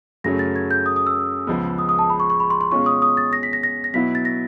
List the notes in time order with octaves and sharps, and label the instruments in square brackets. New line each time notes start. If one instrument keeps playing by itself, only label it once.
[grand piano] F#2 C#3 F#3 A3 C#4 [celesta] A#6
[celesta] A6
G#6
G6
D#6
D#6
E6
[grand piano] C#2 C#3 F3 G#3 B3
[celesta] D#6
D#6
A5
B5
C#6
C#6
B5
C6
C6
[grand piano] B2 G#3 C#4 F4 [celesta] C#6
[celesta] D#6
D#6
A6
A#6
B6
A#6
A#6
A#6
[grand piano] B2 F#3 B3 E4 [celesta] B6
[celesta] A6
A#6